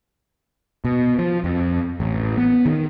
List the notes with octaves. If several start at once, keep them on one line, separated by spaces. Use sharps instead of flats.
B2
F3
F2
A1
B3
D#3